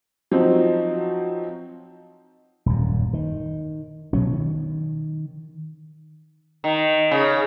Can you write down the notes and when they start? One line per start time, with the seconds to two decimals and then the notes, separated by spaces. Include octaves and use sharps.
0.31 F3 F#3 C4 D#4
2.66 D#1 F#2
3.13 D#3
4.13 B2 F#3 C#4
4.32 D#3
6.64 D#3
7.11 C#3